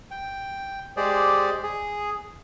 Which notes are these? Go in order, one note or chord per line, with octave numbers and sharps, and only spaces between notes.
G5
G#3 G4 G#4 C5 D5
G#4